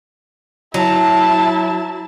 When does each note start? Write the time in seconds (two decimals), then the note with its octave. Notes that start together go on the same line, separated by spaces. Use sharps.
0.74 F#3 E4 A5